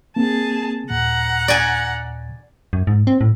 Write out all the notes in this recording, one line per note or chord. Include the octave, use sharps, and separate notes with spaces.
A#3 C4 G#4 A5
D#2 A#2 F#5 A#5
D5 G#5
F#2
G#2
C4
A2